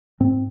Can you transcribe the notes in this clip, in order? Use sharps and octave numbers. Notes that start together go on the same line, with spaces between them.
G#2 C4